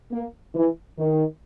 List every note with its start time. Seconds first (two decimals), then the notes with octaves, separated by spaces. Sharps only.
0.12 A#3
0.55 E3
0.99 D#3